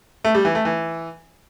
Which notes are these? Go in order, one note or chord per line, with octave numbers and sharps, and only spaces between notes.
A3
G3
E3
A3
E3